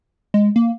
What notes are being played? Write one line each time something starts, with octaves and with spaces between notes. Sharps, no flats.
G#3
A#3